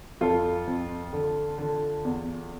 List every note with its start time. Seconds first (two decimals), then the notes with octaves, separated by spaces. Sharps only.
0.21 F2 F4 A4
0.67 F2
1.13 D3
1.58 D3
2.05 E2